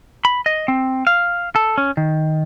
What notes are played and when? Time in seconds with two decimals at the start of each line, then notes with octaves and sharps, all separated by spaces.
0.25 B5
0.46 D#5
0.68 C4
1.07 F5
1.56 A4
1.78 C#4
1.97 D#3